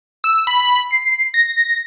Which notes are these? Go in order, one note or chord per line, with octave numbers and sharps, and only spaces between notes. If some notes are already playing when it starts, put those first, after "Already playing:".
E6
B5
C7
A#6